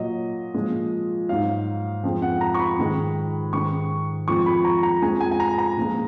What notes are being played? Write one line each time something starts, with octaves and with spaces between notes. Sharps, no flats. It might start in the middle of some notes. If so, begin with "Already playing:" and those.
Already playing: A#2 F#3 D#5
A#2 F3 G#3
G#2 F#3 F5
F2 F3 G#3
F#5
A#5
C#6
B5
G#2 D#3 G#3
G#2 D#3 G#3 C#6
F2 F3 G#3 C#6
B5
A#5
A#5
F2 F3 G#3 G#5
G#5
G#5
A#5
A#5
A#2 F3 G#3